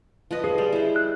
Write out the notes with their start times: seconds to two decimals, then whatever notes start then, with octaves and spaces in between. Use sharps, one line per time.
0.31 F3 B4 D#5
0.44 G#4
0.58 G3
0.72 E4 C5
0.96 F#6